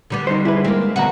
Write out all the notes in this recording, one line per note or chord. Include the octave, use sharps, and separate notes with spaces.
D3 G3 B3
D#4 C5
E4 G#4 B4
G#3 A#3 C4
D2 B2 F#4 A#5